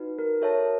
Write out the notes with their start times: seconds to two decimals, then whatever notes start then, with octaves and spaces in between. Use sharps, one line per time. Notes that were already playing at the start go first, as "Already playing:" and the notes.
Already playing: D#4 F#4 B4
0.19 A#4
0.41 F#4 A4 C#5 E5 A5